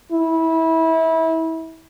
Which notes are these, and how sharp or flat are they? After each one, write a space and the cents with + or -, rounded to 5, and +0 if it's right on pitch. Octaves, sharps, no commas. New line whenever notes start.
E4 -25